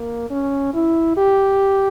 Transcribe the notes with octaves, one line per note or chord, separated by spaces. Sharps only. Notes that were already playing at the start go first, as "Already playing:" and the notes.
Already playing: A#3
C#4
E4
G4